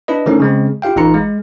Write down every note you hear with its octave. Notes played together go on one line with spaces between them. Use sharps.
D4 E4 B4 D#5
D3 F3 A3 C#4 D#4 A#4
C#3 G#3 C4
E4 F4 G4 F5 G5
A1 E3 D#4 F4 A#5 C#7
G#3